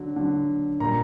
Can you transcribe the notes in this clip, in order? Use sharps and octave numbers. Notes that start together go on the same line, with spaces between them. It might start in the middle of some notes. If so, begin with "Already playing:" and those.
Already playing: D3 F#3
D3 F#3
A#2 G3 A#5